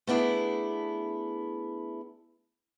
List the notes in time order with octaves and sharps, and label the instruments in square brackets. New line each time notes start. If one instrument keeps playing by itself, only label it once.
[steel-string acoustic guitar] A3 B3 D4 E4 G#4